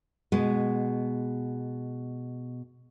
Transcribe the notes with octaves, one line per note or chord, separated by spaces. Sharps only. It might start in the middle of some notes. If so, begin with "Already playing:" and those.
B2 G#3